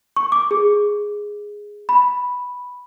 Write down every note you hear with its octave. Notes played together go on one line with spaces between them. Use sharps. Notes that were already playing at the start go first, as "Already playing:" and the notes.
C#6
D6
G#4
B5